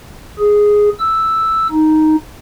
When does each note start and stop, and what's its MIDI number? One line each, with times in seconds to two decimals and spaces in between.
0.39 0.89 68
0.99 1.67 88
1.72 2.16 63